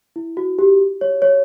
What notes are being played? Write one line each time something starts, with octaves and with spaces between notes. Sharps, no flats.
E4
F#4
G4
C#5
C#5